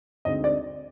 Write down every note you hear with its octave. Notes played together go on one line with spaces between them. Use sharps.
D2 D3 G#3 C4 D#4 D#5
D5